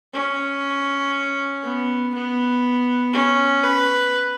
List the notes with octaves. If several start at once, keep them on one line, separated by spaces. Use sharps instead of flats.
C#4
B3
B3
C#4
B4